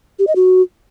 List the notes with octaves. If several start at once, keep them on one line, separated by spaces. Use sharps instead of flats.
G4
D#5
F#4